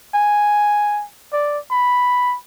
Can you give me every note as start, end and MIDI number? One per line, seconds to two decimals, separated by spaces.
0.14 1.04 80
1.33 1.58 74
1.71 2.35 83